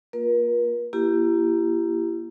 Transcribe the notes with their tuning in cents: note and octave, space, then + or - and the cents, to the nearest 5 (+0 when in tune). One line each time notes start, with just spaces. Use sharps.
A#3 +0 F4 +20 A#4 +40
A#3 +5 E4 +30 G4 +0